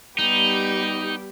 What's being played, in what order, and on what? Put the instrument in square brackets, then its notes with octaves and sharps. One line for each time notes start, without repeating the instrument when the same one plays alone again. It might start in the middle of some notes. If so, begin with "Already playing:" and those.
[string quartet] G3 B3 G4 [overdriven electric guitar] D#4